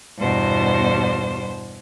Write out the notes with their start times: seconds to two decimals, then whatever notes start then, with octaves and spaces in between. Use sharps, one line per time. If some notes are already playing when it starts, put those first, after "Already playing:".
0.18 E2 G2 B2 C5